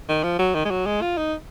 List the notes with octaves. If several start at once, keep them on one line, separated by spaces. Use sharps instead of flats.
D#3
F3
F#3
D#3
G#3
F#3
G#3
F4
D#4